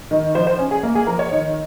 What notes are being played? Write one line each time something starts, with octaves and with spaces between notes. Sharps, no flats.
D#3
F3 C5
C5
C#4
G#4
A#3
G#4
F3 A#4
C#5
D#3